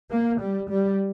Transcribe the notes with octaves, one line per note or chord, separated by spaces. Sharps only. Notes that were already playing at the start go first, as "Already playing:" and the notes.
A#3
G3
G3